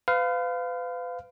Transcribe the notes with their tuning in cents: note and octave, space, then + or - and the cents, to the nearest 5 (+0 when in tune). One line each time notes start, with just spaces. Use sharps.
B4 +40 F5 +0